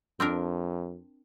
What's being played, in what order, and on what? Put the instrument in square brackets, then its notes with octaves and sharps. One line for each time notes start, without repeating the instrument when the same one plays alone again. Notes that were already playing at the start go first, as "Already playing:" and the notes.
[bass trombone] F2 [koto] C4 D4 A#4